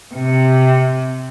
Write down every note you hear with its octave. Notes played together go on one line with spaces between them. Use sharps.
C3